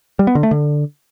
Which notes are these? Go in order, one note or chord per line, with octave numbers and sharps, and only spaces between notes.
G3
B3
D3
A3
D3